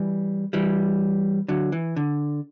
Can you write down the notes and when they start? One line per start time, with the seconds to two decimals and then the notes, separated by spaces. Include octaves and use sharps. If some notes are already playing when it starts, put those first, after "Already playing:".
Already playing: E3 G3
0.53 E3 G3
1.48 D3 F#3
1.72 E3
1.96 D3